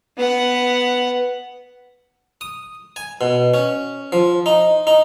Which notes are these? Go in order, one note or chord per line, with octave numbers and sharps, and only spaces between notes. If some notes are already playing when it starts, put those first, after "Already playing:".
B3 F#5
D#6
G#5
B2
C#4
F3
D#4
D#4